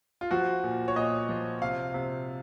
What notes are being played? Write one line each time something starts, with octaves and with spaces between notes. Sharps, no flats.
F4
F3 F#4
A#2
C#5
A#2 D#5
F3
C3 F5
C3